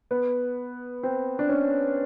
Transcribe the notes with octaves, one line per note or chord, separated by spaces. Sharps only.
B3
C4
D4
C#4